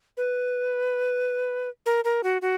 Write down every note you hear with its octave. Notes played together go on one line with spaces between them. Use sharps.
B4
A#4
A#4
F#4
F#4